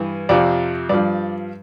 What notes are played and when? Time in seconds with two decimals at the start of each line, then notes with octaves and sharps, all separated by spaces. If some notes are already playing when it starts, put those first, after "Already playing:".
Already playing: G2 E3
0.29 F2 C3 F3 D5
0.89 G2 F3 D5